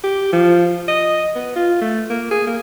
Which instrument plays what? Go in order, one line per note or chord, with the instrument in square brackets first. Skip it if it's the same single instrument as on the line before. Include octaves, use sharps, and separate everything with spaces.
[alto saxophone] G4
F3
D#5
B3
F4
A3
A#3
G#4
A#3